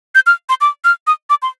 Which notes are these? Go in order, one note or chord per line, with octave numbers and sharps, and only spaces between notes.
G6
F6
C6
D6
F6
D#6
D6
C6